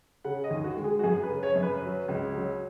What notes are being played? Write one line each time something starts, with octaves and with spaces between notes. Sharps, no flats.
C#3 F#5
D#5
D#2
F#4
G#3
G#4
F#4
F#2 G#4
B4
C#3
C#5
F#2
B4
F#3
C#2
F#3